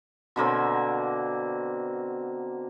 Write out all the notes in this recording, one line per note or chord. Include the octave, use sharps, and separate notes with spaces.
B2 D3 A#3 C4